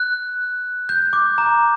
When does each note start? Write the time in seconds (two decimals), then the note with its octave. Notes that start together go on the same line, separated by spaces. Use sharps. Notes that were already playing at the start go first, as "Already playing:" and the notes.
Already playing: F#6
0.89 G6
1.13 D6
1.38 A#5